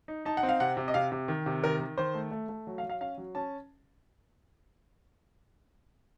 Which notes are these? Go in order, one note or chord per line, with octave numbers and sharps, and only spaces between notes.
D#4
D#4 A5
F#5
C4
F5
C3 F#5
C3
D#5
C3 F5
C3
D#3
C3
D#3 A#4
D#3
D#3 C5
A3
A3
A3
F#3
F5
F#3
F5
C#4 F5
F#3
C#4 A5